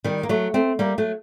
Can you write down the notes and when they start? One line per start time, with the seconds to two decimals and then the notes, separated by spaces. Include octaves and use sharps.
0.04 D#3 G3
0.23 A#3
0.29 F#3 A3
0.54 A3 C4
0.79 G3 A#3
0.98 F#3 A3